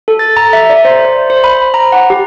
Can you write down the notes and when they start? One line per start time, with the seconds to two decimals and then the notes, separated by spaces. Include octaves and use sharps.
0.08 A4
0.19 A6
0.37 A#5
0.53 E5
0.70 D5
0.85 C5
1.05 C5
1.30 C5
1.44 B5
1.74 A#5
1.92 F#5
2.10 G4